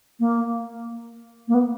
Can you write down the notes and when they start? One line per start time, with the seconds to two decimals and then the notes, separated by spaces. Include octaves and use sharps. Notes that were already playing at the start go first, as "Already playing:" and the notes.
0.20 A#3
1.48 A#3
1.54 B3